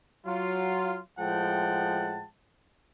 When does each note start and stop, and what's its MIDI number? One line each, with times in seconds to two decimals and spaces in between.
0.26 0.99 54
0.26 0.99 65
1.19 2.25 45
1.19 2.25 53
1.19 2.25 56
1.19 2.25 78
1.19 2.25 79
1.19 2.25 81